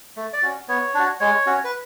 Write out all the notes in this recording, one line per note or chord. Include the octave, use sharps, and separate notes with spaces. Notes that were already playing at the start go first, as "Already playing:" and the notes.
A3
D5
C#4 F#4
B3 C#5
D4 F#4
G#3 C#5
C#4 F#4
B4